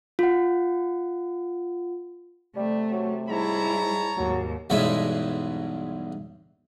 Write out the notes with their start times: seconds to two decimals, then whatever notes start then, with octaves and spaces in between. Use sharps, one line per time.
0.19 F4 F#5
2.56 C3 G3 A3
2.91 F#3
3.29 G#2 G3 E4 C#5 A5 A#5
4.17 D#2 G#2 F#3
4.70 B1 E2 G2 G#3 E5